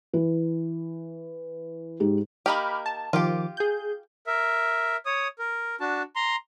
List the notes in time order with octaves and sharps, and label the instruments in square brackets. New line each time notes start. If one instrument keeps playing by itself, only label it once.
[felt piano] E3
G#2 G4
[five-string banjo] A#3 D#4 G4 [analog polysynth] B5 D6 F6
[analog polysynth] A5
[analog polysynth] D#3 F3 D6 [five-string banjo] F4 G4
[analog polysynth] G#4 G6
[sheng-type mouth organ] A#4 E5
C#5 D#6
A#4
D4 F#4 A5
A#5 C6